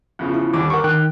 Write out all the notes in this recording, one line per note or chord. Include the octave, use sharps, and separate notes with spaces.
E2 C#3 F3
E4
D#2 D3 G3 D6
A#4 F#5 C#6 D6
D#3 G5 F#6